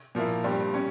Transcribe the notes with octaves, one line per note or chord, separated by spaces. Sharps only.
A#2 F3 A#3 E4
G2 G3 C4
G3 C#4